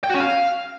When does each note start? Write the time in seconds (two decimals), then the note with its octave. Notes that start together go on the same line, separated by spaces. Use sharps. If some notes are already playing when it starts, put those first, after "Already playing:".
0.04 G5
0.09 F#4
0.15 C#4
0.20 F5